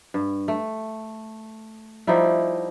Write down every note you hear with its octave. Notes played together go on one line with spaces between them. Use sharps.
G2
A3
F3 G3 D#4 E4